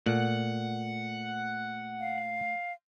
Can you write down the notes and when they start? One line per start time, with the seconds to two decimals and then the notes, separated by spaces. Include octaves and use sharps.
0.06 A#2 A3 F#5
2.00 F5